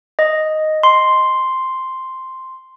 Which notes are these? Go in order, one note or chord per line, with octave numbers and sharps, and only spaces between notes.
D#5
C6